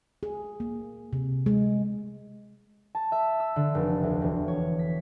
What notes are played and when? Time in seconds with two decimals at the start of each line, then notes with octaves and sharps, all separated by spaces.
0.23 G#4
0.60 A#3
1.13 C3
1.46 G#3
2.95 A5
3.12 E5
3.40 E6
3.56 D3
3.75 F1
4.03 D2
4.22 E1
4.48 C#5
4.79 B6